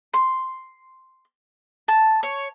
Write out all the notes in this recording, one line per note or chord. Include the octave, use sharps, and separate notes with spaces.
C6
A5
C#5